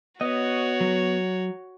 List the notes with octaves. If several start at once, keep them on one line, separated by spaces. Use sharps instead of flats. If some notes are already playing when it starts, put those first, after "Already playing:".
B3 F#4 C#5 D#5
F#3